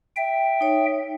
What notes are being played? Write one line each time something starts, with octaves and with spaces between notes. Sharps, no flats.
E5 G5
D#4 C#5